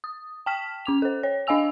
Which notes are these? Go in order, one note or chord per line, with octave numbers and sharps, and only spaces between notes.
D#6
G5 A5 F6 B6 E7
C#4 D6 F7
A4 C5
C#5
D4 D#5 F5 G#5 E6 F7